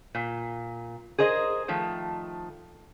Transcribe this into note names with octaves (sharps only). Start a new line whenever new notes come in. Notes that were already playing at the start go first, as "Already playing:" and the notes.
A#2
G#4 A#4 C5 D#5
D#3 F3 A3